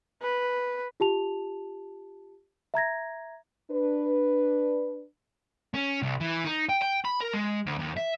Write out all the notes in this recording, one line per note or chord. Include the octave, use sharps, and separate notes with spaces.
B4
F4 G4 A5 F7
E5 A#5 G#6 A#6
D4 B4
C#4
C2
E3
D#4
G5
G5
B5
A#4
G#3
D2
D#2
E5